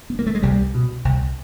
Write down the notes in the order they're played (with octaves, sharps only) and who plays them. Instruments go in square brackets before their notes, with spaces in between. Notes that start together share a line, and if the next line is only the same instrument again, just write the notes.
[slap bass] B3
A#3
A3
G#3
C2 G3
B2
C2